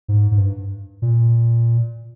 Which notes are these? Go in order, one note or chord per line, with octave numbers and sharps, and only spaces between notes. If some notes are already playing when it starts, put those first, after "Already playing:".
G#2
G#2
G2
A#2